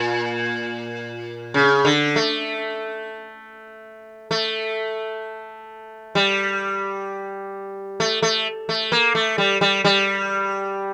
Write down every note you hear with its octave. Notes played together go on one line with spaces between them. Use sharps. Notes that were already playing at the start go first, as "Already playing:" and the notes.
Already playing: A#2
C#3
D3
A3
A3
G3
A3
A3
A3
A#3
A3
G3
G3
G3